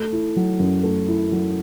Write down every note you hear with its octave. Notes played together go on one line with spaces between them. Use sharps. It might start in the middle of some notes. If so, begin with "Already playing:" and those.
Already playing: A3
E4
F#3
F#2
A3
E4
F#3